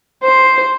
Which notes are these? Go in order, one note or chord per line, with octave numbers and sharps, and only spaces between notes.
C5